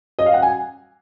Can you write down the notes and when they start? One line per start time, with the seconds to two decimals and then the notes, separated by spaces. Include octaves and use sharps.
0.19 D#5
0.26 F5
0.34 F#5
0.42 G#5